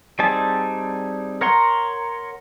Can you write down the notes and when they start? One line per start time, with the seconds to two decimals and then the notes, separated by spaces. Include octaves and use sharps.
0.19 G3 C4 D#4 G#4 A5
1.41 A#4 C#5 F#5 A#5 C6